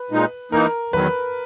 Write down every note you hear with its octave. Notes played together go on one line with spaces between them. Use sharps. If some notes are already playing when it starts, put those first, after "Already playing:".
Already playing: B4
A#2 G#3 D#4
E3 A#3 D#4 A#4
E2 D#3 F#3 B4